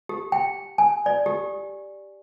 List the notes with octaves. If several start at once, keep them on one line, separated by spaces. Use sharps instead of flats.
G4
G5
G#5
D5
G4